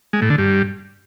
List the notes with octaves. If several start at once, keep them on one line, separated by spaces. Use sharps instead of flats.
G#3
A2
D3
G2